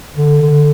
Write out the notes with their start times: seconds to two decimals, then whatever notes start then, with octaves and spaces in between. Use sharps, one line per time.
0.15 D3
0.42 D3